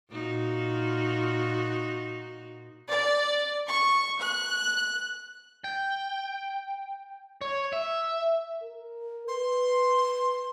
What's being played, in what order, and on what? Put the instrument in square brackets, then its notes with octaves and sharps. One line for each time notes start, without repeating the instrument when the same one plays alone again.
[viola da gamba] A#2 D#4 F#4
[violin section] D5
C#6
F#6
[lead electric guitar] G5
C#5
E5
[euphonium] A#4
[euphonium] B4 [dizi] C6